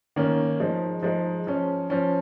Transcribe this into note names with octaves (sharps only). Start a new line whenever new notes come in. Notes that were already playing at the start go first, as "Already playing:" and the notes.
D#3 A#3 C#4
F3 G#3 D#4
F3 G#3 D#4
F3 C#4
F3 C#4